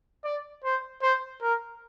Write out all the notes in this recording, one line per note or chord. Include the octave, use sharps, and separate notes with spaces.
D5
C5
C5
A#4